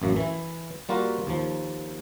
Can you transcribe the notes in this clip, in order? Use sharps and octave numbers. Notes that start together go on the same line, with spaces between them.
A1 F#2 A#3
E3 E4
G3 A#3 F4 F#4 A#4
D#2 F3